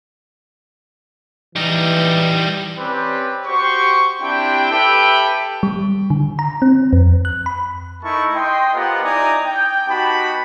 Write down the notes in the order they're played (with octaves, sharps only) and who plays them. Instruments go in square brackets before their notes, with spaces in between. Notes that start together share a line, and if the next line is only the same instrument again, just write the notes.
[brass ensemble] E3 [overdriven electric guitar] G3 D#4
[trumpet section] C4 C#4 G4 B4 C5 D5
F#4 G4 C5 C#6
C4 D4 E4 G4 G5
G4 A4 B4 E5 G5
[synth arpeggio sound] G3
D3
A#5
C4
F2
F#6
B5
[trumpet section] A3 D#4 E4 A#4 A5 C#6
D#5 G5 C6
B3 F4 G4 A#4 C5 F#5
D#4 E4 D5 G#5 A#5 D#6
G5
B3 D#4 F#4 G4 A5 B5